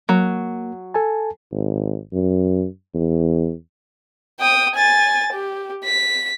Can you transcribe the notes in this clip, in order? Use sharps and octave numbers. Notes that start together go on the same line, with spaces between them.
F#3 A#3
A4 G#5 A5
G#1
F#2
E2
G5 D#6
G#5 A6
G4
B6